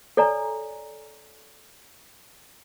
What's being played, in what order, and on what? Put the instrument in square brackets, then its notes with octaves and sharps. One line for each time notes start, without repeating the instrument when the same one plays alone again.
[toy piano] A4 C#5 D5 G#5 A#5